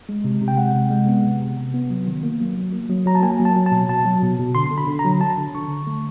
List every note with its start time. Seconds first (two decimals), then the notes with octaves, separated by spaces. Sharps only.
0.09 G#3
0.24 C3
0.41 C3
0.48 G5
0.57 G#3 F#5
0.75 C3
0.90 G#3
1.07 B3
1.24 C3
1.40 C3
1.57 C3
1.74 B3
1.90 F#3
2.07 D#3
2.23 A#3
2.40 F#3
2.57 F#3
2.72 A#3
2.90 F#3
3.06 F#3 A#5
3.15 A5
3.22 A#3 G#5
3.40 F#3
3.45 A5
3.56 F#3
3.66 A5
3.72 B2
3.89 B2 A5
4.05 F#3
4.22 B2
4.39 B2
4.55 D3 C6
4.71 D3
4.78 B5
4.88 D3
4.99 A#5
5.05 F#3
5.21 D3 A5
5.38 D3
5.55 D3 C#6
5.70 D3
5.87 A3